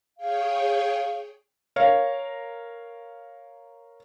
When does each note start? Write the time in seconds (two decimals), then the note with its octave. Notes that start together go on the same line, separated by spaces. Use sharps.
0.17 G#4 C#5 F5 G5
1.76 A#4 C#5 F5